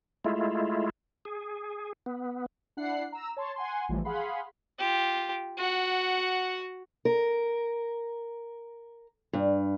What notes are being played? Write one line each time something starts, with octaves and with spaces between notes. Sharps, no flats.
G#3 A3 E4 F4
G#4
B3
D4 E4 F#5 F#6 C7
A#5 E6
C#5 A5 C6
F#5 G#5 C6
A1 A2 E3 F3 G3
G#4 F5 F#5 B5 C6
F4 G4
F#4 F#5
A#4
G2